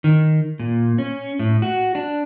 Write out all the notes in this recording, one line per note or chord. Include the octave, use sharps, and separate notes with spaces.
D#3
A#2
C#4
A2
F#4
D4